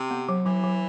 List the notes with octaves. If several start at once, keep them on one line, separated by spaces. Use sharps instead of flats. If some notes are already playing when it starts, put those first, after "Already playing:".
Already playing: C3
B3
F#3
E3 F#3
F#3